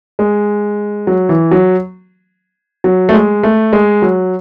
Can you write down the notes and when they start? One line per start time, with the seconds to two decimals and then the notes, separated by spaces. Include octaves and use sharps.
0.19 G#3
1.07 F#3
1.29 E3
1.51 F#3
2.84 F#3
3.09 A3
3.13 G#3
3.43 A3
3.73 G#3
4.02 F#3